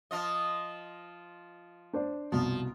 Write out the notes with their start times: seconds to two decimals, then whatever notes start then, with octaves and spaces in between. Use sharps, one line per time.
0.11 F3 F4 D#5
1.93 D4 C5 D5
2.32 C2 B2 F3